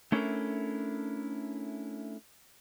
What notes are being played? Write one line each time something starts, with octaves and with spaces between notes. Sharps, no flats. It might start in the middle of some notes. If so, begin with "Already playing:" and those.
A3 C#4 D4 E4 A4 A#4